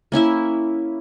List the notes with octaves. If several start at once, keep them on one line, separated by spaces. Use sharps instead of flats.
A#3 C#4 E4 E5